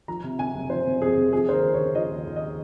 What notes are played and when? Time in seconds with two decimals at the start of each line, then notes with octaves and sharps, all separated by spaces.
0.08 F3 A#5
0.23 C3
0.39 C3 G#5
0.55 F#1
0.70 F3 C5
0.86 C3
1.02 F2 G#4
1.17 C3
1.32 F3 G#4
1.48 D#2 C5
1.53 A#4
1.64 C#3
1.74 C#5
1.79 C#3
1.95 F3 D#5
2.10 D#2
2.26 D#2
2.36 D#5